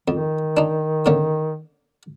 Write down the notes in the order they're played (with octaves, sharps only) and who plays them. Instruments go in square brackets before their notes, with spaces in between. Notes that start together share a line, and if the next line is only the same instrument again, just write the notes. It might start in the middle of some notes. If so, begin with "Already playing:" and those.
[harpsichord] F2 [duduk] D#3
[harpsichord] D4 D#4
D3 A#3 C#4